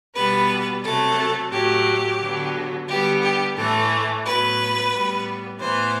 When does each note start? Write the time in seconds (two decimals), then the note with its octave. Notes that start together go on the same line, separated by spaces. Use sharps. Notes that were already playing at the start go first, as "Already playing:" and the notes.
0.16 B2 G3 B3 B4
0.84 C3 F#3 A3 A4
1.52 A2 F#3 A3 G4
2.20 D3 F#3 B3
2.88 D3 G3 B3 G4
3.22 G4
3.56 A2 E3 A3 A4
4.24 A2 F#3 B3 B4
4.92 A2 G3 B3
5.60 A2 E3 B3 C5